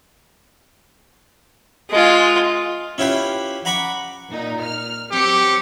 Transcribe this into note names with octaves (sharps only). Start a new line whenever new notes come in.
G#3 F4
C#4 E4 F4 G4 B4
F#5 A#5 B5 C#6 D6
A#2 D#4
F6
F#3 C4 G4 C#7